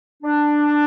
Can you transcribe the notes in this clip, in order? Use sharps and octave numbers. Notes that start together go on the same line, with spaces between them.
D4